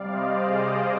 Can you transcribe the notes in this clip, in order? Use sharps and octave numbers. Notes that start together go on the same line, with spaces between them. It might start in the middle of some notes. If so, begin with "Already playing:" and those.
Already playing: C3 G3 D5 F5
C5 D#5
G#4 C5